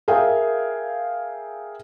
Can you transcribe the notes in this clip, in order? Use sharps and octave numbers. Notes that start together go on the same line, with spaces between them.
G#4 A#4 E5 F5 G5 G#5